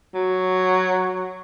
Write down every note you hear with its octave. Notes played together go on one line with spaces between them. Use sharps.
F#3